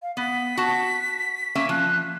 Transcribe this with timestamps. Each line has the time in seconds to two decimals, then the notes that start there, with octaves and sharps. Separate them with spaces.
0.02 F5
0.17 B3 B6
0.57 F#4 A5
1.55 A#3 C#4 E5
1.69 F3 F#6